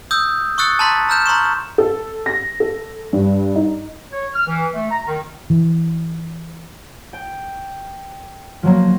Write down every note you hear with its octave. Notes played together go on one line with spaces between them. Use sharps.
D#6 E6 G6
C#6 D#6 E6 F#6 A6 C#7
A5 A#5 C6 F#6 A6 B6
A#5 F6 G6 E7
A#5 C6 C#6 E7
A4
A#6
A4
G2
D#4
C#5
F6
E3
A3
A#5
D#3
E3
G5
F3 F#3 A#3